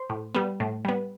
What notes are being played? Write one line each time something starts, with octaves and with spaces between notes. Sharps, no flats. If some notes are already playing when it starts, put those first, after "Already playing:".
Already playing: C5
A2
G3 B3
A2
G3 B3